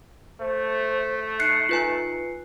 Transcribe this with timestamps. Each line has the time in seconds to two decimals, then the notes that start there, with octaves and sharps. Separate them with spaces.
0.40 A3 C5
1.40 D#4 F#6 C7 C#7
1.69 F4 B4 G#5